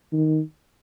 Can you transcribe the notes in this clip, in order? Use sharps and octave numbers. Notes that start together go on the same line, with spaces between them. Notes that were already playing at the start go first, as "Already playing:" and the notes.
D#3